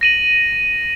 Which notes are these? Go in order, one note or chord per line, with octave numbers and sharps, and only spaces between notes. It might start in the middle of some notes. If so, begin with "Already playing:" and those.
A#6 D#7 F#7